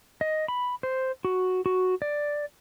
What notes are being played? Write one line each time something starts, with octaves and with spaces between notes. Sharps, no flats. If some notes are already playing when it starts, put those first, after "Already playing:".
D#5
B5
C5
F#4
F#4
D5